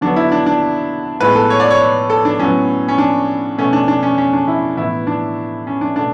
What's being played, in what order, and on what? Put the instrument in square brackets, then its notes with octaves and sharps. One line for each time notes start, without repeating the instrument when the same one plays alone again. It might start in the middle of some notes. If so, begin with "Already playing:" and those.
[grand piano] D3 F#3 B3 D4
E4
D4
D4
A2 G#3 B3 B4
A4
C#5
D5
C#5
A4
D4
A2 F#3 B3 C#4
C#4
D4
B2 A3 C#4
D4
D4
C#4
C#4
D4
E4
A2 E3 B3 E4
D4
C#4
D4
B2 A3 D4